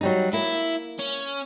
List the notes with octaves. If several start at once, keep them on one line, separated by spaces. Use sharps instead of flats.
F#3 G3 D#4
A#3 E4
C#4